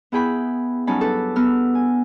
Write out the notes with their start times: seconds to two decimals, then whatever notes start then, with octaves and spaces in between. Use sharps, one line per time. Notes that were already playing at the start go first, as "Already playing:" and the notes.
0.12 B3 E4 G#4 G5 B5
0.87 G2 F#3 C#4 D#4 A5 B5
1.00 D4 A4 B4
1.36 B3 E6 F6
1.75 G#5